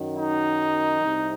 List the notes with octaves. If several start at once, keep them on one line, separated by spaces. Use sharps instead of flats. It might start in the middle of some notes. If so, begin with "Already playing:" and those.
Already playing: F#2 D#3 F#3
D#4
C2 C3